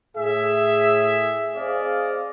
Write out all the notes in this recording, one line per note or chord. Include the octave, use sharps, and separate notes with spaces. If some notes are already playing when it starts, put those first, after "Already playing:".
A2 G#4 E5
C4 G#4 C5 D5 D#5 F5